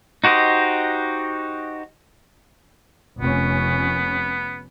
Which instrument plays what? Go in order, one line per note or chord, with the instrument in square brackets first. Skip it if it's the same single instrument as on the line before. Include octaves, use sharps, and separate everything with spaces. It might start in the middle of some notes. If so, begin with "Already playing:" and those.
[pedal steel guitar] D#4 F#4 G4 C5 D#5
[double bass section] F1 C#4 [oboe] B3